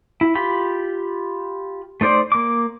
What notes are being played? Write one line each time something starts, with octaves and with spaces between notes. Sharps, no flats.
E4
F4 G4 B5
A3 D#4 C5 D5
A#3 D6